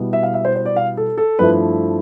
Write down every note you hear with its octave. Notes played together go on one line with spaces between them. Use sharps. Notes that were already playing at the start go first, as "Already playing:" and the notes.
Already playing: B2 G3 B3 E4
E5
F5
E5
C5
C5
D5
F5
A4
A4
G2 F3 A3 E4 B4